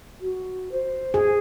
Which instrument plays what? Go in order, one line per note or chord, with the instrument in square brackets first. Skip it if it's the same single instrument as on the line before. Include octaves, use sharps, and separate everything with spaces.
[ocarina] F#4
C5
[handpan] G#4